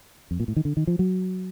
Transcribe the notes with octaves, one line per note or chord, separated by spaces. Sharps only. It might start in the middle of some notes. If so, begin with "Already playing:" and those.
F2
A#2
A2
D#3
D3
D#3
F3
F#3